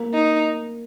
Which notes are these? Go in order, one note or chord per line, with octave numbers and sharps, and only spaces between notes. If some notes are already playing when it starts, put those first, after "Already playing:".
Already playing: A#3
D#4